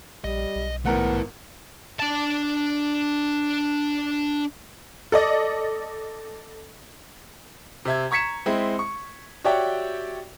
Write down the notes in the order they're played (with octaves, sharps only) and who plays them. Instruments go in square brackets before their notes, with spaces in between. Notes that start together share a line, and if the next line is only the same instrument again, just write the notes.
[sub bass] A#1 [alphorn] G3 [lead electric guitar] D#5
[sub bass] B1
[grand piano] G#1 A#4 F#5 [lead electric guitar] A3 E4 [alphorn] B3
[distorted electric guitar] D4 A5
[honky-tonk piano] A4 D5 D#5
[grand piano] C3 E5 G#6
A#5 C#6 G#6 B6 C#7 E7
G#3 C4 E4
C#6
F#4 G4 C#5 D5 E5 G5